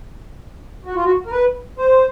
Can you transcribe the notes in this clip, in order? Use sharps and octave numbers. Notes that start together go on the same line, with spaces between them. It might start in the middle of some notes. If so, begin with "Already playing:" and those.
F#4
F4
F#4
A#4
B4
C5